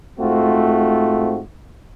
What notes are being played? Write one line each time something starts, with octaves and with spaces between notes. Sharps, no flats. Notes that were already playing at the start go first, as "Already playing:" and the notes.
G#2 A3 C4 F4 F#4